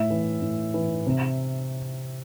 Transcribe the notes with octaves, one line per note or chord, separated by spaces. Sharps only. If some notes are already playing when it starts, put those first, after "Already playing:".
Already playing: A2 E5
E3
A2
E3
C3